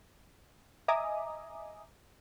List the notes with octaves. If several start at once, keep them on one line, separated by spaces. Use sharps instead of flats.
D#5 E5 G#5 A#5 D6 D#6